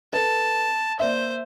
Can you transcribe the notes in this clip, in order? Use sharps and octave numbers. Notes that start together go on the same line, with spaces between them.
A4 B4 A5
A#3 C5 D5 E5